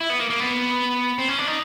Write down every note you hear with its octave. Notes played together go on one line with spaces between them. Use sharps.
E4
B3
A#3
A#3
B3
C4
C#4
D4
D#4